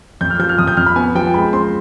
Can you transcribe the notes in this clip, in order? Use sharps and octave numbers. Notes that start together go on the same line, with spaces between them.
F2 G6
F6
F3 G6
F6
F2 D#6
G6
F2 F6
B5
B3 G#5
F3 G5
G#3 B5
C4 C6